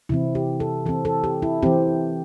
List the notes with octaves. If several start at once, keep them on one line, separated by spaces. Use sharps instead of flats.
C3 E3 C4 E4
G4
A4
E3 C4 A4
A4
G4
E4
E3 C4 G4